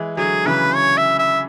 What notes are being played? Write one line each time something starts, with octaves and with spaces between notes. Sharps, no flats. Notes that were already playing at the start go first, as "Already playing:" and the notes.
Already playing: E3 G#3
D3 F#3 G#4
C#3 E3 B4
C#5
E5
E5